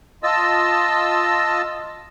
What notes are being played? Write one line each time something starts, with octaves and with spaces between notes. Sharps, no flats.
F4 D#5 A5 E6